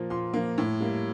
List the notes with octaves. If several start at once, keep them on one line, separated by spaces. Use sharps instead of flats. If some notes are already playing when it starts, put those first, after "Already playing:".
Already playing: A#2 F3 A#3
A#2 C6
F3 A#3
A2
G3 A#3